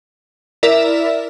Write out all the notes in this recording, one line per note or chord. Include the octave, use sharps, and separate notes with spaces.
E4 A#4 D5 E5